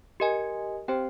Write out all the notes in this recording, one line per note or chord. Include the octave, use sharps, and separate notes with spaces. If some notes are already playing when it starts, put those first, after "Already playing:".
G4 A#4 D#5 G#5
C4 G4 C5 G5